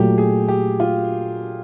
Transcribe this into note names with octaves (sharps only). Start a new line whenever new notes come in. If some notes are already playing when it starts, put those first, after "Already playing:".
Already playing: A#2 F#3 A3 G4
G#4
G4
F4